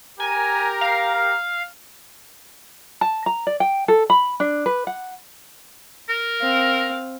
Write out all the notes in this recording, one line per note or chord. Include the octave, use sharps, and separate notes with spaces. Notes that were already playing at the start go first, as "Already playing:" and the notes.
G4 A#4 G#5
F5
A5
A#5
D5
G5
A4
B5
D4
B4
F#5
A#4
C4 F5